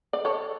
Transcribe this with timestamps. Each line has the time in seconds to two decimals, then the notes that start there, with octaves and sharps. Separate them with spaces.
0.13 D5
0.25 A4 C#5